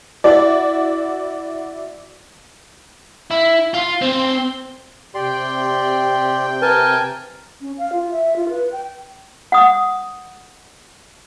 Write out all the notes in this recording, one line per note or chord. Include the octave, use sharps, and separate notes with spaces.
E4 F#4 D5
E4
F4
C4
C3 G4 D5 G5 C6
A#4 B4 G#5 A5
C#4
F5
F4
E5
F4
B4
G5
F#5 D#6